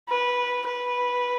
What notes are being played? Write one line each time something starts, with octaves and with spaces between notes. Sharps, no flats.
B4
B4